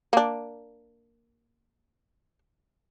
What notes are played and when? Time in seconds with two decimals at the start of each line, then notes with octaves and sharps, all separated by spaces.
0.13 A#3 D4